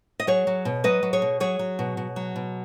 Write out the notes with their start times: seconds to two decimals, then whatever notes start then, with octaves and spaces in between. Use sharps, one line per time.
0.20 D#5
0.27 F#3 G#4 C#5
0.47 F#3
0.65 B2
0.84 F#3 B4 D#5
1.03 F#3
1.13 G#4 C#5
1.22 B2
1.40 F#3 G#4 C#5
1.59 F#3
1.79 B2
1.97 B2
2.16 F#3
2.36 B2